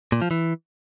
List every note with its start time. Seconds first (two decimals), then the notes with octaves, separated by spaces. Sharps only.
0.12 A#2
0.21 F3
0.31 E3